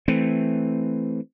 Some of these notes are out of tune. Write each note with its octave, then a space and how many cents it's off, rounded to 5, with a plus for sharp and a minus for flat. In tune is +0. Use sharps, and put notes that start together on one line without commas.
E3 +0 A3 +0 C4 +0